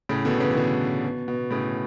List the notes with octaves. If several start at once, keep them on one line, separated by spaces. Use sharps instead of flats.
A2 C#3
B2 D3
C#3 E3
E3
B2 D3
B2
B2
A2 C#3